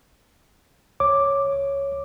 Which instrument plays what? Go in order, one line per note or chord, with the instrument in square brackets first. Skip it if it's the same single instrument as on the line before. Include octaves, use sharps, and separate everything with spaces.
[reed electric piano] C#2 C#5 D6